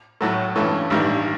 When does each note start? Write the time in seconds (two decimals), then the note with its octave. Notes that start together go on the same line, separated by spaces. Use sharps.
0.21 A2 F#3 A3
0.55 G2 E3 A3 C#4
0.90 A1 G2 D#3 G3